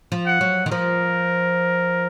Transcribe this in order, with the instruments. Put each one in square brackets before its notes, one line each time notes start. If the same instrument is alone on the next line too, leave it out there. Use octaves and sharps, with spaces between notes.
[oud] F3
[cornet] F#5
[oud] F#3
D#3
[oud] F3 [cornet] A#4